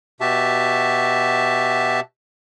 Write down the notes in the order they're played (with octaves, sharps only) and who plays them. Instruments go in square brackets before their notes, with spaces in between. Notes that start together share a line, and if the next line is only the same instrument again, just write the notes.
[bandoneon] B2 F#4 G4 E5 A5